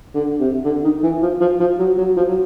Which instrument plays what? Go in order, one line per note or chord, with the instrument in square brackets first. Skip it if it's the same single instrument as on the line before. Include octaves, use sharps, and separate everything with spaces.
[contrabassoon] D3
C3
D3
D#3
E3
F3
F3
F3
F#3
F#3
F3
F#3